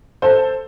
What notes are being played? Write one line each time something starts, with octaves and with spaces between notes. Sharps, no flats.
A4 C5